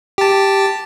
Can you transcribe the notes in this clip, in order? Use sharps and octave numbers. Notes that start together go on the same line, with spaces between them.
G4 A5